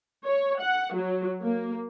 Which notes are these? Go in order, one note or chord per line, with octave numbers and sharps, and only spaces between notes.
C#5
F#5
F#3
A#3